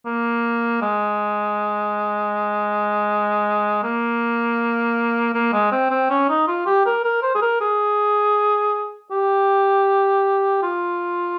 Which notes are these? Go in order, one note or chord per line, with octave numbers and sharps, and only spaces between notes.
A#3
G#3
A#3
A#3
G#3
C4
C4
C#4
D#4
F4
G4
A#4
A#4
C5
G#4
A#4
G#4
G4
F4